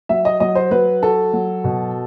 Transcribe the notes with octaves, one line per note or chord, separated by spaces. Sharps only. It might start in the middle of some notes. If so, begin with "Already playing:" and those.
F#3 E5
D#5
F#3 D#5
C5
F#3 B4
F#4 A4
F#3
B2